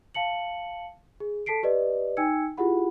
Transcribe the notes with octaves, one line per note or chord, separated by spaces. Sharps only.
F5 A5 C#7 F#7
G#4
A4 A5 B6 C7 D7
G4 B4 D5 D#5
D#4 G5 G#5 E6 G#6 C#7
E4 F4 G4 G#4 F#5 B5